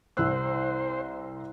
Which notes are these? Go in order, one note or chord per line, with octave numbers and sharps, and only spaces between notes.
C2 C5 E6 F#6